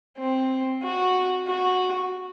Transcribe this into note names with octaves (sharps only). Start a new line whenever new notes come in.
C4
F#4
F#4